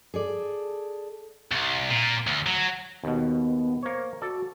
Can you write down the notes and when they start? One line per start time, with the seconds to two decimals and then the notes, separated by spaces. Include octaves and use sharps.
0.14 G#4 A4 D5
1.52 C2
1.90 A#2
2.27 D2
2.46 F#3
3.04 D#2 B2 B3
3.83 A#3 C5 C#5
4.22 F#4 A4 D5